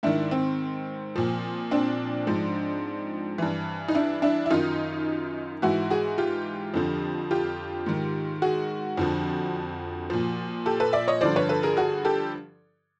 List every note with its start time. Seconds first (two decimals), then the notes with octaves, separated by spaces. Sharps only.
0.03 G#2 D#3 D4 E4
0.31 C4
1.16 A#2 F3
1.71 C4 D4
2.27 G#2 F3
3.38 G2 E3
3.88 D#4
3.95 D4 E4
4.22 D4 E4
4.46 E4
4.50 F#2 D#3 D#4 F4
5.62 G#2 E3 E4 F#4
5.90 F#4 G#4
6.18 F4 G4
6.74 F2 D3 F3
7.31 F4 G4
7.86 G#2 D#3
8.42 F#4 G#4
8.97 F2 D3 F3
10.10 A#2 F3
10.66 G4 A4
10.80 A4 B4
10.93 D5 E5
11.08 C#5 D#5
11.21 G2 D3 F3 C5 D5
11.36 B4 C#5
11.49 A4 B4
11.63 G#4 A#4
11.77 F#4 G#4
12.05 G4 A4